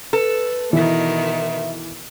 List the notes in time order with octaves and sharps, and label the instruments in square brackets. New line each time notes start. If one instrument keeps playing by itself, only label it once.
[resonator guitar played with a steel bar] A4 [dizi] B4
[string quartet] B2 D#3 B3 [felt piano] E3 [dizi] E5